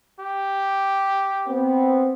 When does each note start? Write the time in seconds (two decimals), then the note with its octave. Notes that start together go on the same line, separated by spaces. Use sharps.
0.19 G4
1.47 B3 C4